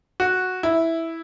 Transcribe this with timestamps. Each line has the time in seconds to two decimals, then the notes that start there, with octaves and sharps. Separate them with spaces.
0.20 F#4
0.63 E4